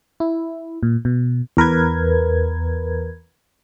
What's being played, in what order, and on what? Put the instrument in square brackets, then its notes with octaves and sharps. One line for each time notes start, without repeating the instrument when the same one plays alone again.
[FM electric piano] E4
A#2
B2
E2 A#4 B4 G#6